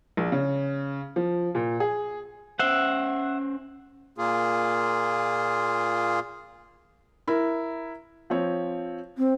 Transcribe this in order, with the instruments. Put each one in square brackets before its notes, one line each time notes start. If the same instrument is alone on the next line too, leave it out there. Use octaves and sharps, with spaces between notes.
[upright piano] A#1
C#3
F3
A#2
G#4
[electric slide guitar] C#4 C5 [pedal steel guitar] E5 F#5
[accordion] A#2 A#3 F4 G#4
[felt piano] E4 A#4
F3 C4 C#5
[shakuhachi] C4